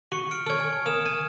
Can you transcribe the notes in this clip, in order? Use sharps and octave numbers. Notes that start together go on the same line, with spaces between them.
F#4 C#6 C#7
F6 C#7 D7
A4 C#5 F6 G#6
G#5
A#3 D#6 F6 E7
G#5